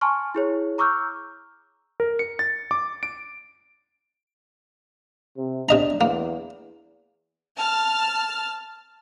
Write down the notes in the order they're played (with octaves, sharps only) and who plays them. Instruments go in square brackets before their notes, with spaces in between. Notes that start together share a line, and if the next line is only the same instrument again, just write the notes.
[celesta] G#5 A5 C6 C#6 F6
E4 G#4 C#5
A#5 C#6 D6 E6 F6 G6
[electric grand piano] A#4
C#7
A6
D6
D7
[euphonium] C3
[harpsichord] C3 D#5 A#5 [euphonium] D4
[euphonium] E2 [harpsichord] A#3
[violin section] A5 F6